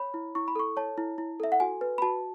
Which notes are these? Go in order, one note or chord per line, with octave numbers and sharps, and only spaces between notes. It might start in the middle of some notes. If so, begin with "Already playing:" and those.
Already playing: C#5 B5
E4
E4 C#6
B5
A4 C#6
C#5 A5
E4
E4
A4 E5
F#5
F#4 G#5
B4
B5
F#4 A5